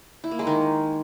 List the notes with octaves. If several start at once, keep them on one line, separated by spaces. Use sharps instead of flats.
E4
A#3
G#3
D#3